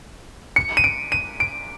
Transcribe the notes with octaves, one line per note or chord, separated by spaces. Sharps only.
C#7
D#7
D7
D#7
D7